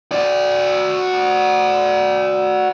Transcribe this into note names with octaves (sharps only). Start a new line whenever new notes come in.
F#4 D5